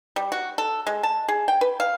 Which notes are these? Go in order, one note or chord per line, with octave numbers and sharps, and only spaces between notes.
G3
F#4
A4
G#3
A5
G#4
G5
B4
F5